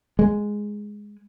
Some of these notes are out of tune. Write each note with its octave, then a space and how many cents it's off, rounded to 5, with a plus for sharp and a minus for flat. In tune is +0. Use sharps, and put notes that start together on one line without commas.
G#3 +0